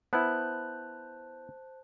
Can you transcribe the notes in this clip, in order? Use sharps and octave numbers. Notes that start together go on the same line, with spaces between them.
B3 E4 C5 A5 F#6